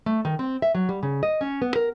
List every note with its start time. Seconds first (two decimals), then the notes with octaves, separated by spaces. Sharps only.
0.06 A3
0.25 D#3
0.39 C4
0.62 E5
0.75 F#3
0.89 G3
1.03 C#3
1.23 D#5
1.41 C#4
1.62 B3
1.76 A#4